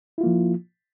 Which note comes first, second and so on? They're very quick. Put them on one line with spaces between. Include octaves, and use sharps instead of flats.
E4 F4 A#3 F3